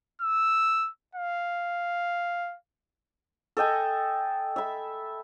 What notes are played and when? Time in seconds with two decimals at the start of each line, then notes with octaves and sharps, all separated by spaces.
0.21 E6
1.15 F5
3.57 A4 D#5 G5 G#5
4.56 E5 B5